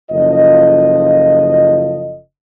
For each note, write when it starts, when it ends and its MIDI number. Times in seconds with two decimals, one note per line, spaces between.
0.11 2.19 30
0.11 2.19 49
0.11 2.19 53
0.11 2.19 65
0.11 2.19 69
0.11 2.19 75